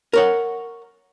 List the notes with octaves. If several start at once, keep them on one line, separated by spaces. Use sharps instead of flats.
A#4 C#5 F#5